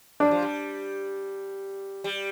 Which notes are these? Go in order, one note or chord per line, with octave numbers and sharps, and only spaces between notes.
G3 D4
F3
G3
G3